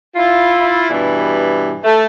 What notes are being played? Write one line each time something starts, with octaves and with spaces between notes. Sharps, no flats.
E4 F4
G2 B2 E3 G3
A3